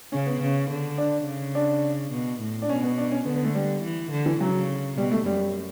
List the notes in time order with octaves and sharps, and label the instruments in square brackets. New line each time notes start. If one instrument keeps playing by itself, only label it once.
[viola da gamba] C#3 [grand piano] C#4
[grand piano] B3
[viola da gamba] C#3
D3
[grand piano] D4
[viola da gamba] C#3
[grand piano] D4
[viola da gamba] B2
A2
[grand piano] D4
[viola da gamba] B2 [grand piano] C#4
[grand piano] B3
D4
C#4
[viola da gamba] D3 [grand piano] B3
[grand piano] B3
A3
G3
[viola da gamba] E3
D3
[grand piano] E3
[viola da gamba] C#3 [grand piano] F#3
[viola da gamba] B2 [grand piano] G3
[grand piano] A3
[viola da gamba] F#2 [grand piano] G3